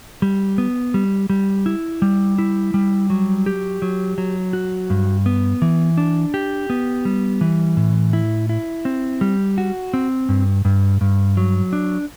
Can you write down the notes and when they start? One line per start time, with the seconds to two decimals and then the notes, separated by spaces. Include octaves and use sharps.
0.22 G3
0.58 B3
0.94 G3
1.30 G3
1.66 E4
2.02 G3
2.38 E4
2.74 G3
3.10 F#3
3.46 G4
3.82 F#3
4.18 F#3
4.53 F#4
4.90 G2
5.26 B3
5.62 E3
5.98 D4
6.34 G4
6.70 B3
7.05 G3
7.41 E3
7.77 A2
8.13 E4
8.49 E4
8.85 C4
9.21 G3
9.58 F#4
9.94 C4
10.29 G2
10.65 G2
11.01 G2
11.37 F#3
11.73 D4